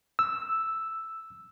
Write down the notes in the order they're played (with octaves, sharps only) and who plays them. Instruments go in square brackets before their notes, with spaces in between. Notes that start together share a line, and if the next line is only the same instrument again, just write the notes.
[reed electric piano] E6